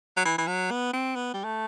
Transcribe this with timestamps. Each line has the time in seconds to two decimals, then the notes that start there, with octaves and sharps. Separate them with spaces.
0.17 F#3
0.25 E3
0.38 E3
0.48 F#3
0.71 B3
0.93 C4
1.16 B3
1.34 G3
1.45 A3